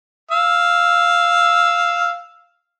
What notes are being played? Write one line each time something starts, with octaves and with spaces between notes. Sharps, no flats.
F5 E6